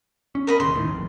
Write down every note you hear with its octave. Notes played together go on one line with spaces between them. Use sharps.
C#4
A#4 D#5 B5
E1 D#2 C#3 C6
D#2 A2 D#3
G1 F2